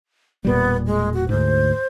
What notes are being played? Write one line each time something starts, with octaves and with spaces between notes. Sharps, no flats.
E1 A#2 G3 B3
G#3
F#4
D2 G#2 C5